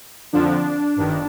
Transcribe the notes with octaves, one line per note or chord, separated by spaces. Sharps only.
F2 D3 F3 D4
G1 G2 D#3